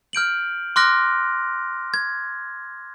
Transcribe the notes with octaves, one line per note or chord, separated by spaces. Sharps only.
F6 G6 D7 F#7
C6 D6 F6 F#6 A#6 D7
G#6